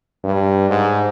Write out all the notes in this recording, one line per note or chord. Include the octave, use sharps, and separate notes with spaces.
G2
G#2